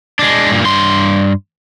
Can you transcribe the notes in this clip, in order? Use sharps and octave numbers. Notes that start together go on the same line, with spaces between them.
G#3 D4
G2 A#2
G2 C6